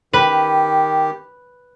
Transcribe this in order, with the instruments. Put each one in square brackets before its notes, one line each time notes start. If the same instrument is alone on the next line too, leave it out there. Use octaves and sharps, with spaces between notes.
[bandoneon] D#3 G4 [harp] B4